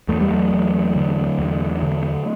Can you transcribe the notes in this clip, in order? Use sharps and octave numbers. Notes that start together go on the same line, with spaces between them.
E2 A3
G3
F#3 A3
E2
D3
E2
D3